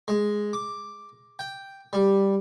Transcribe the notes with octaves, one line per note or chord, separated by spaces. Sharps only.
G#3
D6
G5
G3